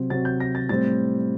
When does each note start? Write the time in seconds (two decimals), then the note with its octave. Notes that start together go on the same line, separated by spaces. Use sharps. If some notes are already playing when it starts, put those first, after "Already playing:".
Already playing: C3 F#3 C4
0.10 C3 F#3 C4 A6
0.25 G6
0.40 A#6
0.55 A6
0.69 A2 G3 C4 A6